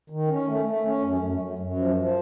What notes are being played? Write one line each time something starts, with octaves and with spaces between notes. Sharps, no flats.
D#3
C#4
A3
A3
C#4
F#2
F#2
F#2
F#2
F3
F3